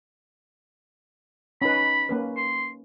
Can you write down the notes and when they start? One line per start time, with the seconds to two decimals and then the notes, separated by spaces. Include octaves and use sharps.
1.62 C#4 D#4 B4 B5
2.09 A#3 C#4 B4
2.36 C6